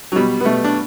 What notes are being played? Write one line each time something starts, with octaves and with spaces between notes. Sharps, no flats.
F#3
B2 G3
B3
B2 A3
D4